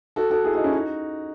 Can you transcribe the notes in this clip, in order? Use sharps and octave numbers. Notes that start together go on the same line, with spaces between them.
F#4 A4
F#4 A4
E4 G#4
D#4 F#4
C#4 E4
D#4 F#4